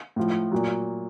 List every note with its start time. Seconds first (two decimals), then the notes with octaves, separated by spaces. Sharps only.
0.16 A2 F3
0.52 A#2 F#3